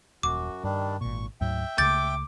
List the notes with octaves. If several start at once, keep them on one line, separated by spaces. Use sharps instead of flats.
D#1 F#2 F#4 D6
G2 D#3 G3 D4
G#1 A#2 C#6
D2 G#2 F#3 E5 G5
C#2 C#3 A3 D6 G6 A6